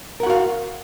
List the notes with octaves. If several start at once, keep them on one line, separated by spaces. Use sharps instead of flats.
F#4 A#4 F5 F#5